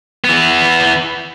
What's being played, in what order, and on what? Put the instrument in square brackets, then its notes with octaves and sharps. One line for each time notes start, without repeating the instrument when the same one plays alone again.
[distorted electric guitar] E3 B3